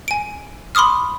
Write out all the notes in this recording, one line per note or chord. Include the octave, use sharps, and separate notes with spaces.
G#5 D7
B5 C6 D6 D#6 F6